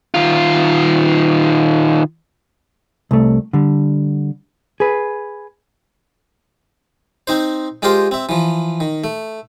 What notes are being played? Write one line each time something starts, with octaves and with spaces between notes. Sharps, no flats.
D#3 F4
C2 A3
D3 G3
G#4 B4
C4 D#4 C5
G#3 F4 G4 A#4 C5 G5
C4 E5
E3 F3
D#3
A3